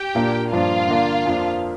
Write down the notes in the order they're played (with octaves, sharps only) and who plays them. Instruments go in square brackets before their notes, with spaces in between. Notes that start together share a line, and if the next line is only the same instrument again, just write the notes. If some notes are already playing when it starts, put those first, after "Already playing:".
Already playing: [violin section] G4 G5
[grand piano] A#2 A#3 D4
[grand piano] G2 F3 A#3 D4 [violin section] F4 F5
[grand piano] D3 A#3 D4
F2 F3 A#3 D4